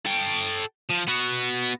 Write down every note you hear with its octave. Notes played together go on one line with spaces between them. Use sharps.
A4 G5
F3
B3 F#4